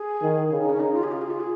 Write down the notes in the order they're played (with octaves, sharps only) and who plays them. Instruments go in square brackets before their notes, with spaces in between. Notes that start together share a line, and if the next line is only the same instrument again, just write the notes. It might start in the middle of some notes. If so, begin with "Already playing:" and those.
Already playing: [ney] G#4
[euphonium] D#3
[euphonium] C#3 [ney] G#4
[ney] D#4
C#4
[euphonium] C#3 [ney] D#4
[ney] F4
G#4
F4
G#4
F4
G#4